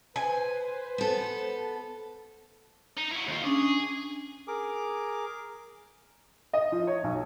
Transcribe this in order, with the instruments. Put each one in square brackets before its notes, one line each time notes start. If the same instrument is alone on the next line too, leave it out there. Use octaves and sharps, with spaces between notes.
[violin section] B4 C5 [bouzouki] G#5
[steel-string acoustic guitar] B3 A4
[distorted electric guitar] D#4
E4 F#4
D#2 F4
[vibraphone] C#4 D4 [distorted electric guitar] G#4
[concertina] G#4 A#4 D6
[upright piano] D#5
F3
C#5
B1